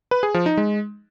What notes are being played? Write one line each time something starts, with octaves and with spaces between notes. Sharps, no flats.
B4
G#4
F3
D#4
G#3